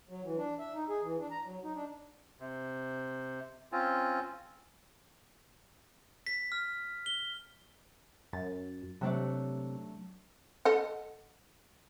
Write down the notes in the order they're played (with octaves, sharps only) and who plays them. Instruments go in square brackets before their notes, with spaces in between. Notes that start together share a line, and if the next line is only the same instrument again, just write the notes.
[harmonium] F#3
E3
D4
E5
D#4
G#4
E3
D4
A#5
F#3
D#4
D4
[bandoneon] C3
C4 C#4 F4
[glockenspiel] B6
F6
G7
[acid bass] F#2 [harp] A6
[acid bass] C3 [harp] F#3 A3 D4
[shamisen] A4 D#5 F#5